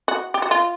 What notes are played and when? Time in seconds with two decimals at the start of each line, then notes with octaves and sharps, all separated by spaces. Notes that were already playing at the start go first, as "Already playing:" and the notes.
0.08 F#4
0.34 G4
0.42 F#4
0.51 F4